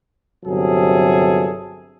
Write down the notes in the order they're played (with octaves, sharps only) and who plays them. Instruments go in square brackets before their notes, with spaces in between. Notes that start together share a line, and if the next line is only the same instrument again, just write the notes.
[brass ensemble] G1 C3 F#3 G#4 A4